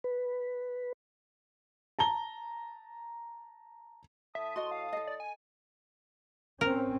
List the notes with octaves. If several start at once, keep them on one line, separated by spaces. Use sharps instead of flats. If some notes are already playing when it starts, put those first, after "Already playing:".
B4
A5 A#5 G7
A2 E5 A5 D#6
F#4 D#5 C6
F5
A4 D#5
D5
G#5
C4 C#4 A#4